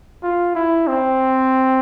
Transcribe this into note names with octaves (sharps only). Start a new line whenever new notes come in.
F4
E4
C4